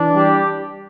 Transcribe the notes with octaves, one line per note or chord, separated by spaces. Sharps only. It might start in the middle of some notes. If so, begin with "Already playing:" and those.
Already playing: E3 D4
G3 G4